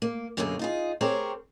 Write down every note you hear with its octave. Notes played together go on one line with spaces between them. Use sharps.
A#3
F#2 B2 D3 F#3 A#3 G#4
D#4 F4 G#4
C4 G4 G#4 A#4 C5 C#5